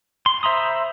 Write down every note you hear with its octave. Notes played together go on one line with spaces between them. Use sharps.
C6
C5 E5 A#5 B5 D#6